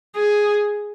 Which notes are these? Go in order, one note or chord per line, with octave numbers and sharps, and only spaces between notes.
G#4